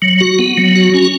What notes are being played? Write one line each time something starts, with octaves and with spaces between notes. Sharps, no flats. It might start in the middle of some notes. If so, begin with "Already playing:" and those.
F#3
F#4
B3
F#3
F#4
C#4